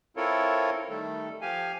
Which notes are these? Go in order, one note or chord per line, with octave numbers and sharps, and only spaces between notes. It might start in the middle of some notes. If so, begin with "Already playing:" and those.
C4 E4 F4 A4 A#4 C#5
D#3 G3 A3 A4
F3 G4 F5 G#5